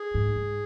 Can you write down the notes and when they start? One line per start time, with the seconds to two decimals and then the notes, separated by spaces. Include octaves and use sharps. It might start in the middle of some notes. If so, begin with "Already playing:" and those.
Already playing: G#4
0.14 G#2
0.36 G#2